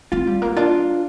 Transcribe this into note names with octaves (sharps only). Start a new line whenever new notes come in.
C4 F4
G3
A#3
D4 F4